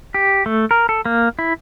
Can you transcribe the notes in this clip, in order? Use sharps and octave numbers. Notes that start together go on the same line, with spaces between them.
G4
A3
A#4
A4
A#3
E4